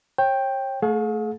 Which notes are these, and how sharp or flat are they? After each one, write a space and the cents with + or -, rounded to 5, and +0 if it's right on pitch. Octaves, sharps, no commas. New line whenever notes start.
C#5 -35 G5 +5
A3 +0 G#4 +40 F5 +45